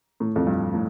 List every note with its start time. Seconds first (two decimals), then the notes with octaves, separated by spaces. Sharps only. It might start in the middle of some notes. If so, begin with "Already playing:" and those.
0.20 A2
0.36 F2
0.47 G2
0.74 A2